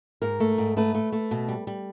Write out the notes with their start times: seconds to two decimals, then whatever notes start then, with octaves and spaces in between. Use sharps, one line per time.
0.22 G#2 A#4
0.40 A3
0.58 G#2
0.77 A3 B4
0.94 A3
1.12 A3
1.31 B2
1.48 G3
1.67 G3